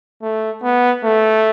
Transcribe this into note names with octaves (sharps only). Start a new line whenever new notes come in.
A3
B3
A3